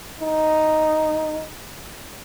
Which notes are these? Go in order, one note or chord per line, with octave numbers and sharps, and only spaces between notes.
D#4